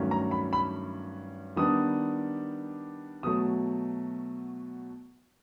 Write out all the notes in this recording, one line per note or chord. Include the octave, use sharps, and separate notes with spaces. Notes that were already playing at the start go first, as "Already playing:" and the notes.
Already playing: G2 D#3 F#3 A3 C#4
A#5
B5
B5
D#3 G3 B3 D4 D#6
B2 F#3 A3 D#6